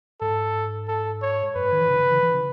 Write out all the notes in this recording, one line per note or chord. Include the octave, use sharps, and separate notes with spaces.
G#2 A4
A4
C#5
F#2 B4
G#2
D#3
E3
C#3
C#3
E3
E3
C#3